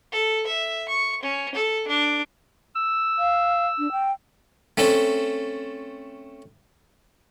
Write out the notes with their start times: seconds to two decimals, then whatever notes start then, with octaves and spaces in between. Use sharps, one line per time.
0.12 A4
0.47 E5
0.89 C#6
1.23 C#4
1.55 A4
1.87 D4
2.76 E6
3.19 F5
3.79 D4
3.92 G5
4.77 A3 C4 C#4 A4